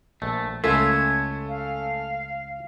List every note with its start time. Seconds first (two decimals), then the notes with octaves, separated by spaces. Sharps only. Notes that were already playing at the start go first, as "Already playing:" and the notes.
0.22 A#1 A3
0.64 C#2 A3 C#4 F4 E5 G#6
1.48 F5